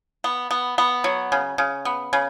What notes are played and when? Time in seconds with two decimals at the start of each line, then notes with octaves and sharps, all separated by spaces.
0.24 B3
0.51 B3
0.78 B3
1.04 F#3
1.32 C#3
1.58 C#3
1.85 B3
2.13 C#3